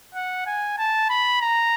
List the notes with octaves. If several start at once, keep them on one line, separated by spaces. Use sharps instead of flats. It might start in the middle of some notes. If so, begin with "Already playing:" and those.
F#5
G#5
A5
B5
A#5